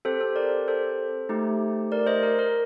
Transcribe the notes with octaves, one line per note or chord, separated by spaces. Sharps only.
C4 G4 A4 C5
A4 C5
A#4 D5
A4 C5
A3 D#4 G4
A#4 D5
C5 D#5
A#4
A#4